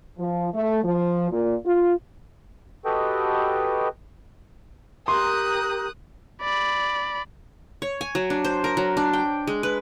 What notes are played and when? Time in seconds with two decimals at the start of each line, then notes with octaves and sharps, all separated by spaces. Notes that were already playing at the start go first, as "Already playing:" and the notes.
0.19 F3
0.54 A3
0.84 F3
1.32 A#2
1.66 F4
2.85 F#4 G4 A4 B4 D#5 G5
5.08 G4 A#4 C6 D#6 F#6 G6
6.42 D5 B5
7.82 C#5
8.01 G#5
8.15 F#3
8.30 D4
8.45 C5
8.64 A#4
8.77 F#3
8.97 D4
9.13 G5
9.47 G#3
9.63 B4